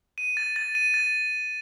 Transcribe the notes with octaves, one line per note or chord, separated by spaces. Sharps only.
D#7
A6
A6
D#7
A6